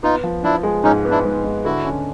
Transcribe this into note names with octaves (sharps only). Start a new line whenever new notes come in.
B3 D#4 F4
F3
F3 D4 E4
G#3
G#2 C#4 D#4
B3
D4 E4
G#2
G#2
D3 E4 F#4
C#4